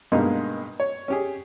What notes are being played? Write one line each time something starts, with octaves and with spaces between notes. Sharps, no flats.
G2 B2 G#3 A#3 D#4 F5
C#5
C#4 G4 G#4